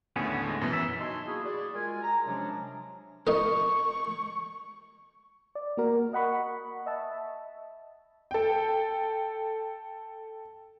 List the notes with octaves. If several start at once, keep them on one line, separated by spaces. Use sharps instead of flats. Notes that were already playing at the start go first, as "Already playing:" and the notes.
D#2 A2 D3 B3 C#4 G#4
G#3
F#2 B2 E3
E5
D#4 F#4 D#5 G#5 A5 C6
A#3 E4 F#4 G#4
F#4 G#4 D5
G#3 F4 A#4 G#5
A#5
C3 F3 F#3 G#3 C#4 D4
D#4 A#4 C#6
D5
A#3 F#4 A#4
D#5 F#5 B5 C#6
D#5 E5 A5
A4 G5